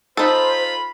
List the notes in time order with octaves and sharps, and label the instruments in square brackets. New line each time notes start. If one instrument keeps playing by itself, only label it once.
[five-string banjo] D#4 A4 [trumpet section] F4 B5 [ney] C5